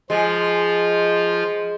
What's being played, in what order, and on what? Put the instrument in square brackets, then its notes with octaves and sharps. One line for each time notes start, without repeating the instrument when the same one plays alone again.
[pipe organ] F3 F4 [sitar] G#3